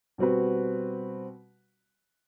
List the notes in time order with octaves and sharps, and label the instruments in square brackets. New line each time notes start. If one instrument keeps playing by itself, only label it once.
[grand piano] B2 G3 C4 F#4 B4